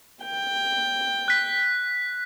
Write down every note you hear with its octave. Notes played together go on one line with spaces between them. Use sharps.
G5
F#6 B6